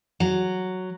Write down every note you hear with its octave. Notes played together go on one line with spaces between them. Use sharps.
F#3